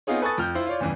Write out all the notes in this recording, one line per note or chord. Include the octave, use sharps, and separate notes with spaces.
B3 C4 D#4 F4 G#4 C#5
A4 B4 G#5 C#6 D#6 A6
F2 F6 G6
E4 F4 C5
F4 C#5 D5
E2 G2 C#3 E3